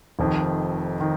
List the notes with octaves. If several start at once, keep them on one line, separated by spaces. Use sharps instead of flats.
F1 F2 D#3
D#3